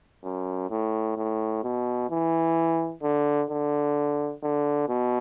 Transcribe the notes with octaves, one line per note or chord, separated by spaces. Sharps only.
F#2
A2
A2
B2
E3
D3
D3
D3
B2